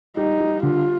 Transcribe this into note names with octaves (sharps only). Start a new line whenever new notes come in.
G3 D#4
G3
D3 F4